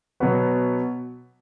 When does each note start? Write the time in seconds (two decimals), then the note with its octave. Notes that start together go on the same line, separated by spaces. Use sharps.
0.20 B2 F#3 B3 F#4 B4